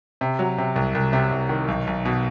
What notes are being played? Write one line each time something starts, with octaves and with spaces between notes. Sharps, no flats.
C3
F#3
C3
C2
C2
C3
C2
D#3
B1
B1
B2